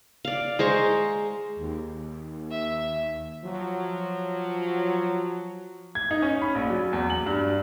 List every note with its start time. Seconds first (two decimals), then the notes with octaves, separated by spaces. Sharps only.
0.25 D5 F5
0.59 G#3 C5 A#5 C#6
1.59 D#2
2.51 E5
3.43 F3 F#3
5.95 G#6
6.11 D#4
6.22 C#4
6.42 B5
6.55 A#1
6.70 F#3
6.93 E2
7.10 F#7
7.26 G2